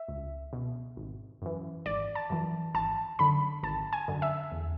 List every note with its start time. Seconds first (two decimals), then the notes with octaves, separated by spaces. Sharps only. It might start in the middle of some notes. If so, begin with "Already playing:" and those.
Already playing: E5
0.08 C#2
0.53 B2
0.97 G#1
1.42 F#2 E3
1.86 G#1 D5
2.15 A5
2.30 F#2 E3
2.75 G#1 A5
3.19 F#2 D3 B5
3.63 G#1 A5
3.93 G#5
4.08 F#2 D3
4.22 E5
4.52 E2